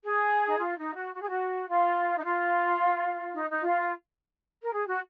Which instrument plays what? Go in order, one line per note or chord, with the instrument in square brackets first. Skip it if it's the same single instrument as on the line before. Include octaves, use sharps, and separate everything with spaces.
[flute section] G#4
D#4
F4
D#4
F#4
F#4
G#4
F#4
F4
D#4
F4
D#4
D#4
F4
A#4
G#4
F#4